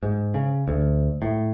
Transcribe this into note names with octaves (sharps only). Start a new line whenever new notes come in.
G#2
C#3
D2
A2